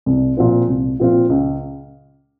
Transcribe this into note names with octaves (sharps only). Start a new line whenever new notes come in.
C2
A#2 F3 C4 F4
C2
A#2 F3 C4 F4
C#2